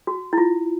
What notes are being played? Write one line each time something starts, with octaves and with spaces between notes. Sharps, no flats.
F#4
E4
F4